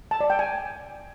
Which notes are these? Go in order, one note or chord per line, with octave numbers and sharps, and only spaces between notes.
A5
D5
G5
G#5